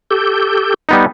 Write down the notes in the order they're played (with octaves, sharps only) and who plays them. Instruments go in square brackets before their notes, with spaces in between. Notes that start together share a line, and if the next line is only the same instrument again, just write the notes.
[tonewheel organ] G4 A4 G6
[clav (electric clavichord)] G3 B3 D#4